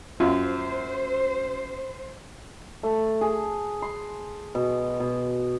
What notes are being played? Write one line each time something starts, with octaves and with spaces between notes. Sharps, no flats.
F#2 F4 C5
A3
G#4
C6
B2
B2